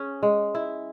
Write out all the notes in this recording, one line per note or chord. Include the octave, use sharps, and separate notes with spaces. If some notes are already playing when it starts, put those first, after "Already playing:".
Already playing: C#4 G#4
G#3
E4